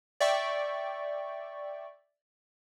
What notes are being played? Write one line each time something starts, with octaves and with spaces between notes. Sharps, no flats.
D5 E5 G5 C#6